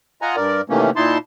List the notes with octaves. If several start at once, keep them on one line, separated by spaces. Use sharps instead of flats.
F4 D#5 F#5 G#5 A#5
G2 A#4 D5
C3 D#3 E3 A3 A#3 C#4
A#2 D#4 E4 A5 C6